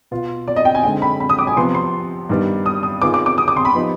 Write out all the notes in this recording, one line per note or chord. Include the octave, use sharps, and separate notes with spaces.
B2 B3 F4
D5
D#5
G5
G#5
D3 G#3 C4 D#4 G5
B5
B5
D#6
D6
G#5
C3 F3 B3 C6
C6
G2 D#3 G3 B3
D#6
D#6
D#3 B3 F4 G#4 D6
D6
D6
D#6
D6
C6
B5
F3 B3 D#4 G4